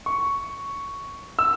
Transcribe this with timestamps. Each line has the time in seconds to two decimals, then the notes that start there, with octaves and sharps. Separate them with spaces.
0.06 C#6
1.39 E6